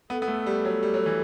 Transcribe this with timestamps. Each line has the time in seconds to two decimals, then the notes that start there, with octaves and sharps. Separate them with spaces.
0.10 B3 A4
0.22 B3
0.28 A3
0.46 G3
0.65 F#3
0.83 G3
0.94 F#3
1.06 E3